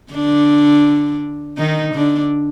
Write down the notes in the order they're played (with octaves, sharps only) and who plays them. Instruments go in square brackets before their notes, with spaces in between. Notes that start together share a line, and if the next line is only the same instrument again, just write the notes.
[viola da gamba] D3 D4
D#3 D#4
D3 D4